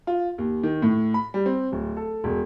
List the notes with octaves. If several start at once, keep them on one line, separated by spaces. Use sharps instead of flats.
F4
D#2
D#3
A2
B5
G3
C4
D1
A4
E1